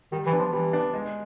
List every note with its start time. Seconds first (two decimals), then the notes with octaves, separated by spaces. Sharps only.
0.12 D#3 G3
0.26 E3
0.32 B3 D4
0.39 F3
0.52 E3 G3
0.73 B3 D4
0.94 G#3